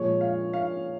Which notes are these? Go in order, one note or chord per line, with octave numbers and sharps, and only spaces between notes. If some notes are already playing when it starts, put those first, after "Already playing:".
Already playing: A#2 F3 G#3 C#5
F5
F5